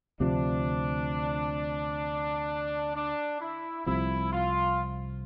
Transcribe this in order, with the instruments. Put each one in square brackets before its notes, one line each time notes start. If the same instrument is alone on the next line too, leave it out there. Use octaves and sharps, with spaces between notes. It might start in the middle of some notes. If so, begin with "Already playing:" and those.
[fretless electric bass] D2 C3 F3 [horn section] D4
[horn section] D4
E4
[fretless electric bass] C2 C3 F3 [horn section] E4
[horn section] F4